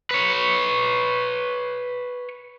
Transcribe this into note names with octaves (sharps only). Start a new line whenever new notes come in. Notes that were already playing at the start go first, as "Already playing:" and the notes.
B4 C#5